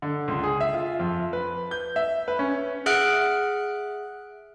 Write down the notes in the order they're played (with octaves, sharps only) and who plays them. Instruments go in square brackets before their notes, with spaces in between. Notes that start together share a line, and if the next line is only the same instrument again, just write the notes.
[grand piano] D3
C#2
G#4
E5
F4
F2
B4
G6
E5
B4
C#4
[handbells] G#4 E5 F#5 F6 F#6 D7